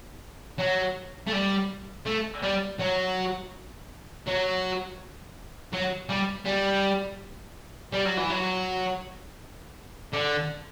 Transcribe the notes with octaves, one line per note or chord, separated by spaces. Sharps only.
F#3
A3
G3
A3
G3
F#3
F#3
F#3
G3
G3
G3
F#3
E3
F#3
D3